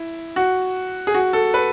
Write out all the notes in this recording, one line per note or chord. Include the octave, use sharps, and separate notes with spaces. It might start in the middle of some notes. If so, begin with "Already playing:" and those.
Already playing: E4
F#4
G#4
F#4
A4
B4